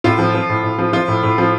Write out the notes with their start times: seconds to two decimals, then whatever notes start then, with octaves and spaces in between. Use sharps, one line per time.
0.04 A2 F4
0.19 F3
0.34 F3
0.49 A2
0.63 A2
0.78 F3
0.93 F3 F4
1.08 A2
1.23 A2
1.38 F3